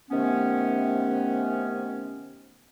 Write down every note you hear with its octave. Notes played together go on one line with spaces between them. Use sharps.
C3 D#3 A3 B3 C#4